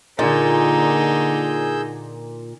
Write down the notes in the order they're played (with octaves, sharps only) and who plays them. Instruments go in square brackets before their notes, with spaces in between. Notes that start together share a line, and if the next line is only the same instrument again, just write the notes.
[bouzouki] A#2 [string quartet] D3 [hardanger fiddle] D#4 [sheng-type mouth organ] G#4 E6 G6